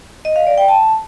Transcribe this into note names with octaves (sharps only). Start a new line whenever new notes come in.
D#5
F5
D5
G5
A5